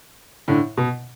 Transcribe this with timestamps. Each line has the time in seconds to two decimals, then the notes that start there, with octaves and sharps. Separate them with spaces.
0.48 A2 D3
0.77 B2